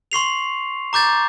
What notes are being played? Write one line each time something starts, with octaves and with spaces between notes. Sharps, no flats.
C6 C#6 C7 F7
A#5 D6 G6 A6